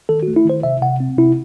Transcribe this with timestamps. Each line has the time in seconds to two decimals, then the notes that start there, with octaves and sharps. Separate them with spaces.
0.09 D#3 A4
0.23 F#4
0.28 A3
0.36 E4
0.45 D#3 C5
0.63 C3 E5
0.82 C3 F#5
1.00 C4
1.18 C3 E4